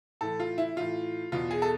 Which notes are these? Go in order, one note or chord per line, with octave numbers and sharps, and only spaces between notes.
A2 E3 A4
F4
E4
A2 E3 F4
E2 B2 F4
G#4
A4